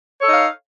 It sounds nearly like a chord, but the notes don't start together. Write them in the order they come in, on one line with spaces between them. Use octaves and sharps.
C#5 A4 D#4 F5